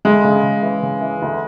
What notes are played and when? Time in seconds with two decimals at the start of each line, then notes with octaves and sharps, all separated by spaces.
0.05 D2 G#3
0.24 C#3
0.43 C#3
0.62 E3
0.83 C#3
1.01 E3
1.22 D2